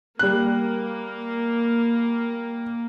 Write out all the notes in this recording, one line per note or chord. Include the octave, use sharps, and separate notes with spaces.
G3 A#3 F#6